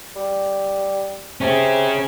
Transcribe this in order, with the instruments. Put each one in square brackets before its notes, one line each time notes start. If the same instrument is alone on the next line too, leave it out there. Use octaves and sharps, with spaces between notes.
[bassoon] G3
[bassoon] C3 [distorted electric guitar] C#4 G#4